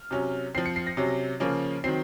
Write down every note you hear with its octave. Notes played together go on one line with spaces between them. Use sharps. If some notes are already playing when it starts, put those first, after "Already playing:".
Already playing: F6
C3 F#3 C#4
F3 C4 C7
C#7
C7
A#6
C3 F#3 C#4
C#3 F3 A#3 C#4
D#3 F#3 C4 C7